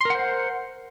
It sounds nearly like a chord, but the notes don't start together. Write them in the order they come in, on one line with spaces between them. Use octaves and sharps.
C6 A#4 F#5 C5